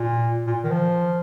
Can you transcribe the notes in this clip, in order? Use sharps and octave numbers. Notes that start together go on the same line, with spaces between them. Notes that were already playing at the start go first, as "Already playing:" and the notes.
Already playing: A#2
A#2
D#3
F3